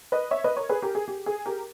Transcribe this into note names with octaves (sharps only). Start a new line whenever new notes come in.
B4 D#5
C#5 E5
B4 D#5
A#4 C#5
G#4 B4
G4 A#4
G#4
G4
G#4
G4 A#4